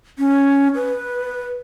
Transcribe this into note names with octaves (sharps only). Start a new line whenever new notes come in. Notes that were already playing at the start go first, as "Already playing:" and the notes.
C#4
B4